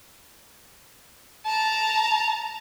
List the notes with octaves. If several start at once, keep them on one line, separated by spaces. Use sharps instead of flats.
A5 A#5